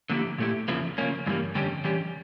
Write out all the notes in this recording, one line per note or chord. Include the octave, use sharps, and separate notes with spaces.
D3 F3 A#3 E4 G4
A#2 A3 E4 G4
E2 C#3 F3 A#3 E4
C#3 F3 A#3 C#4
G2 E3 G3 A#3
F2 D3 G3 C#4 G4
E3 G3 C#4 G4